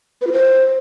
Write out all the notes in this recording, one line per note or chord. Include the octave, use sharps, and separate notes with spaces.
B4
F4
C5